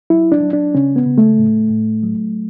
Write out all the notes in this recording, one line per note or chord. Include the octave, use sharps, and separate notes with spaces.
F#3 E4
D4
F#3
D4
C#3 C#4
B3
C#3
A3
A2
A2
F#3